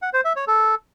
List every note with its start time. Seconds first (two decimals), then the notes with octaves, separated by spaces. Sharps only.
0.02 F#5
0.13 C5
0.25 E5
0.36 C#5
0.47 A4